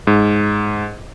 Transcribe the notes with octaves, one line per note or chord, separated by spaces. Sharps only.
G#2